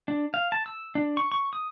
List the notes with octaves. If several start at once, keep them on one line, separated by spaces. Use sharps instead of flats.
D4
F5
A5
E6
D4
C#6
C#6
D#6